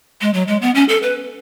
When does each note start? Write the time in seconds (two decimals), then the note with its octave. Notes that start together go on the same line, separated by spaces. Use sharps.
0.21 G#3
0.34 F#3
0.48 G#3
0.62 B3
0.75 C#4
0.89 A4
1.03 B4